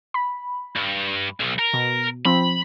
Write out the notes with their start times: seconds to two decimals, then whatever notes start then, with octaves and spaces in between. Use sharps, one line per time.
0.14 B5
0.76 G2
1.40 B1
1.59 A#4
1.73 B2
2.25 F3 C4 B5